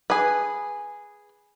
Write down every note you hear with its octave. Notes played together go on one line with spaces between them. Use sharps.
G#4 B4